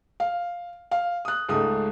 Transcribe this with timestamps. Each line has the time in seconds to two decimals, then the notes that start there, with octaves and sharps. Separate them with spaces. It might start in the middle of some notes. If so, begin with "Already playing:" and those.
0.20 F5
0.91 F5
1.25 D#6 F#6
1.49 C#2 G#2 A3 D#6